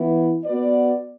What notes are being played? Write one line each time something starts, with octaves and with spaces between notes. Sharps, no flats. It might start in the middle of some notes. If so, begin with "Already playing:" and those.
Already playing: E3 B3 E4
B3 F#4 B4 D5